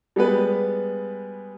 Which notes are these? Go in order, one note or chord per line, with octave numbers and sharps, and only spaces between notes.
G3 G#3 B3 B4